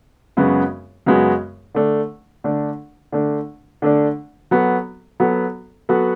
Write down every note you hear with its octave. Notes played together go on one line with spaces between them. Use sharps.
F#2 C#3 G#3 B3 F#4
F#2 C#3 G#3 B3 F#4
D3 A3 D4
D3 A3 D4
D3 A3 D4
D3 A3 D4
F#3 B3 F#4 A4
F#3 B3 F#4 A4
F#3 B3 F#4 A4